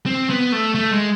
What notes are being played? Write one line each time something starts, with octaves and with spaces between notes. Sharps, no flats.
C4
B3
A3
A3
G#3